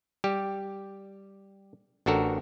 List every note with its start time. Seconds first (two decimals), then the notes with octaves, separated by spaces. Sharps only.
0.24 G3 G4
2.06 A1 D4 F#4 A4 A#4